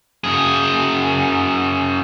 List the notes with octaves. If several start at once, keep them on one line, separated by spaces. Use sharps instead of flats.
F#2 G#4